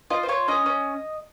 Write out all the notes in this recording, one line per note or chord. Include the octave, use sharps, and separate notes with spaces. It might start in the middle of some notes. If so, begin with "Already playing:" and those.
F4 D#5
C5
F4 C#5
C#4 D#5
C#4